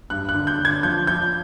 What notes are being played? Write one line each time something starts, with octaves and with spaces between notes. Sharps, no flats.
G2 F#6
F#6
D3
G6
D3
G#6
F3 G6
F3 G6